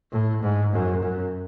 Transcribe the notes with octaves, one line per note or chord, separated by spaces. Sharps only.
A2
G#2
F#2
F#2